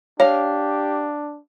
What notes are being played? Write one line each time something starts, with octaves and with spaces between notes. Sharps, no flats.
D4 G4 C#5 F5